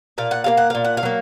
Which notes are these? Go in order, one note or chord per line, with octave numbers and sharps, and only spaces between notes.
A#2 F5
F#5
F#3 A#3 F5
F#5
A#2 F5
F#5
F5
F#3 A#3